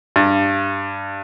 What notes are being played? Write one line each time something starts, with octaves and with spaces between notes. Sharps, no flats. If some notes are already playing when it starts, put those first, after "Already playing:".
G2